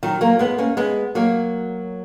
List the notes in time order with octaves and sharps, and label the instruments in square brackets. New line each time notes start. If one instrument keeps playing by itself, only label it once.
[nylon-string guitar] D#3 F#3
F#3 A#3
G#3 B3
A#3 C#4
G#3 B3
F#3 A#3